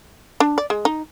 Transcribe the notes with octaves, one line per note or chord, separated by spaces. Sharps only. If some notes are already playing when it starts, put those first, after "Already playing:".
D4
D5
G#3
D#4